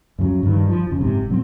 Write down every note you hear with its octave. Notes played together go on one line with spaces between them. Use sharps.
F#2 C#3 F3 F#3
G2 D#3
F3
F2 C#3
F#1 G#2 C3
A#2 F#3 A#3 C4